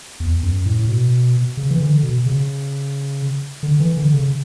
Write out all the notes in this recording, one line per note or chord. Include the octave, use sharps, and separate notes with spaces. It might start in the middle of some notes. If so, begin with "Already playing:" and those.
E2
F#2
A2
A2
B2
C#3
E3
D3
B2
C#3
D3
E3
D3
C#3